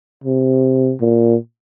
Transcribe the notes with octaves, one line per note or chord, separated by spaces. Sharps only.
C3
A#2